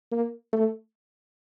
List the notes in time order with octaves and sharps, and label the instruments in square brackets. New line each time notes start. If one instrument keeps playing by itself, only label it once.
[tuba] A#3
A3